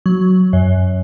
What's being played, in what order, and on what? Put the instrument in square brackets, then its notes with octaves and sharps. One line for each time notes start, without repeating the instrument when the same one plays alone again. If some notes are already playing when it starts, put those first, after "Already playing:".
[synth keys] F#3
F#2